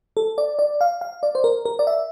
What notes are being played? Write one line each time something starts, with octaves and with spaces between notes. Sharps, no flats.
A4
D5
D5
F5
F5
D5
C5
A#4
A#4
D5
E5